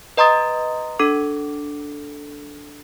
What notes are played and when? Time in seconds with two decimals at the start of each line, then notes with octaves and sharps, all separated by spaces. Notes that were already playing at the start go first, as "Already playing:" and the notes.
0.17 B4 D#5 A#5 C6 D#6 A6
0.99 D4 A4 D6